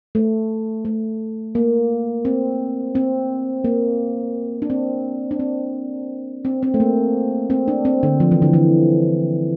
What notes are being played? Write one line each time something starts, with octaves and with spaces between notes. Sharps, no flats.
A3
A3
A#3
C4
C4
A#3
D4
C4
D4
C4
C4
C4
A3
A#3
C4
D4
C4
D3
F3
E3
D3
E3